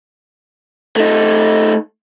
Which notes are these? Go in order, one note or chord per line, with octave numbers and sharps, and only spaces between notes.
A3 D#4